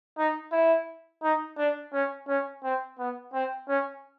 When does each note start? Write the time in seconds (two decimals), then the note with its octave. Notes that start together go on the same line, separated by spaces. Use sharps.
0.18 D#4
0.52 E4
1.23 D#4
1.58 D4
1.93 C#4
2.28 C#4
2.64 C4
2.99 B3
3.33 C4
3.68 C#4